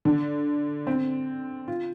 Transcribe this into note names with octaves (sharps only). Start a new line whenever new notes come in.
D3
C4
F4